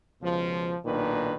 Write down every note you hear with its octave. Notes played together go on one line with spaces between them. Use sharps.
C#2 B2 F3
B1 A#2 D#3 D4 B4